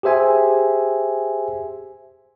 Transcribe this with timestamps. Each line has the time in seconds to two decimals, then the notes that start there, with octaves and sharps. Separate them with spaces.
0.03 G4 G#4 C5 E5 G#5